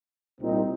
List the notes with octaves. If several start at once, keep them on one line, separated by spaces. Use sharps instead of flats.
C2 A#2 G3 C4 D#4